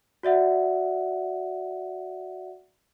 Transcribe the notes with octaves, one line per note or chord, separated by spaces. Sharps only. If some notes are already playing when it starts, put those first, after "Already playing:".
F#4 D5 E5 F#5